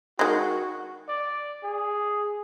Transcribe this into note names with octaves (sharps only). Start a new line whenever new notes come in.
D#3 G#3 F#4
D5
G#4